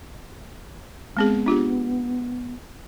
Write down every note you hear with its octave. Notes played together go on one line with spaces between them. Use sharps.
G#3 B3 C4 G#4
D4 F4 G4